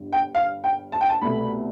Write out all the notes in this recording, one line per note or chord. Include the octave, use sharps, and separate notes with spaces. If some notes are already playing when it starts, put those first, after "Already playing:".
Already playing: G1 G2
G5
F5
G5
A5
G5
A5
C2 B2 A3 B5